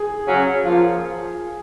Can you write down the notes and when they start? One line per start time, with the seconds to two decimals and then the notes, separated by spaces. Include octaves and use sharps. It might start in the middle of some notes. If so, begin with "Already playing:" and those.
Already playing: G#4
0.25 C#3 F#3 C#4
0.65 F3 A#3 F4